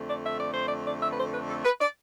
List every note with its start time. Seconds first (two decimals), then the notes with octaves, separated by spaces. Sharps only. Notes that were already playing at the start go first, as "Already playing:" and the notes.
Already playing: F2 D3 A3
0.09 D5
0.25 E5
0.39 D5
0.53 C5
0.67 D5
0.87 D5
1.02 E5
1.11 B4
1.18 C5
1.33 B4
1.49 A4
1.64 B4
1.80 D5